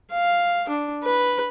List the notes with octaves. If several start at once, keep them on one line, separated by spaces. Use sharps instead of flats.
F5
D4
B4